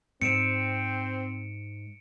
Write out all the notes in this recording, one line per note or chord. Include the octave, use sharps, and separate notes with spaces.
G#2 C4 C#7 D7 E7